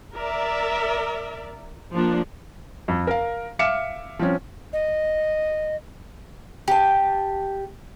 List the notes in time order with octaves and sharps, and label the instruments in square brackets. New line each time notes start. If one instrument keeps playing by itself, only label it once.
[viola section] A#4 D5 E5
F3 A#3 D4
[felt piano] F2
A#4 F5
E5 F5 D6 F6 C#7 E7
F3 C4 C#4
[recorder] D#5
[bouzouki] G4 A5